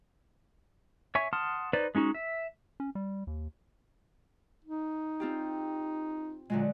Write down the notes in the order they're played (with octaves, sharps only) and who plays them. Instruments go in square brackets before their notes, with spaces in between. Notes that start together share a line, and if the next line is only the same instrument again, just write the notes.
[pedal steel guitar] C#5 E5 G#5 C#6
F#5 A5 C6 D#6 F6
D#4 B4 C5 D5
G#3 C#4 D#4 F#4
E5
[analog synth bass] C#4
G3
D#2
[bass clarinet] D#4
[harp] C4 F4 G4
[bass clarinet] A#2 [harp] D3 F#3 G#3